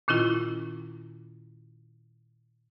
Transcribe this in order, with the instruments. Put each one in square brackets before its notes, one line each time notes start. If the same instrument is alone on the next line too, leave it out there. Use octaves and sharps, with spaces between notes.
[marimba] A#2 D#3 C#4 E4 F4